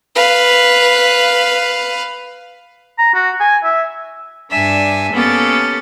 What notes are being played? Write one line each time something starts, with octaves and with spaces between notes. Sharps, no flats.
B4 F5
A#5
F#4
G#5
E5
G2 D4 E5 G#5
A#3 B3 C#4 G4 A4